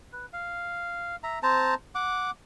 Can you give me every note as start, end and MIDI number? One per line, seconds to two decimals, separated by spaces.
0.13 0.26 71
0.33 1.16 77
1.23 1.39 76
1.23 1.39 82
1.43 1.74 60
1.43 1.74 72
1.43 1.74 81
1.43 1.74 82
1.95 2.31 78
1.95 2.31 86